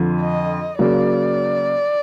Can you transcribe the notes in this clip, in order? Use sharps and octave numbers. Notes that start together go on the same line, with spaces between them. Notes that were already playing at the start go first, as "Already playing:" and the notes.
Already playing: F2 D3 F3
D#5
C#3 F#3 A#3 D5